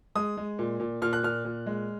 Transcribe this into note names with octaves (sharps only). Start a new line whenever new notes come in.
G#3 D#6
G#3
A#2
A#2
A#2 F6
F#6
A#2 F6
A#2
G#3